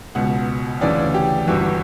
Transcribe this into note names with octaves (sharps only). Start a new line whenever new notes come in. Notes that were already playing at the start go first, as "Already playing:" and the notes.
C#2 B2 F#5
D2 C#3 E3 D5
G4
G1 G2 E3 F#4